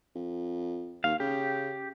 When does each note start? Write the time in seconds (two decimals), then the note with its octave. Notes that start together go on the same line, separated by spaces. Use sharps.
0.15 F2
1.04 D#2 F5
1.20 C#3 G4